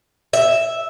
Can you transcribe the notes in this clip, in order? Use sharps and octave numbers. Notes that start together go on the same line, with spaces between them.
E5